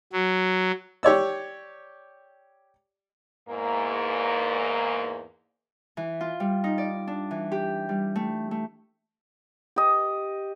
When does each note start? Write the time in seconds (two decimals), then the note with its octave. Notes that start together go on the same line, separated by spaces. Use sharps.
0.13 F#3
1.03 G4 C#5 D5 E6
3.49 E2 G#2 A#3
5.97 E3
6.21 F4
6.40 G3
6.64 D#4
6.78 D5
7.07 D4
7.31 E3
7.52 G4
7.89 G3
8.16 A3
8.51 A3
9.76 G4 D#5